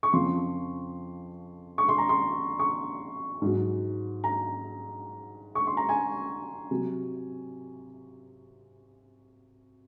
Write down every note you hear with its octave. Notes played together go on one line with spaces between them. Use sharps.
C#6
F2 C#3 F3 C6
C#6
C6
A#5
C6
C#6
G#2 F#3
A#5
C#6
C6
A#5
G#5
C3 F#3